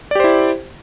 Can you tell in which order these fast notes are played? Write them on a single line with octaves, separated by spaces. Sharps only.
D5 G4 C5 E4